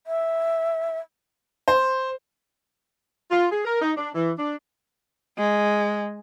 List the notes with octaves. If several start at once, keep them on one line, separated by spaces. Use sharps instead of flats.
E5
C5
F4
G#4
A#4
D#4
D4
E3
D4
G#3